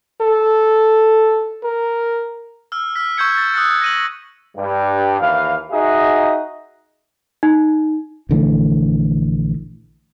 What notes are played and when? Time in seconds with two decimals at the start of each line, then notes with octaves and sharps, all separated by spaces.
0.21 A4
1.64 A#4
2.72 E6 F6
2.95 E6 F6 B6
3.17 C#6 E6 G6 G#6 C#7
3.37 A6
3.54 D#6 E6 F#6 A6 C#7
3.82 A#6 D#7 F#7
4.57 G2
5.20 D#2 E3 F5
5.71 D#4 F#4 G#4 D#5 E5
7.43 D#4
8.29 A#1 D3 E3 A3